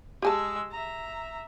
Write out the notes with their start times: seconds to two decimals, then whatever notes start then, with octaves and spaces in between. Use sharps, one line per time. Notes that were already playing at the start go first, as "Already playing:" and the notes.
0.22 G#3 G4 G#4 A5 E6
0.71 E5 A#5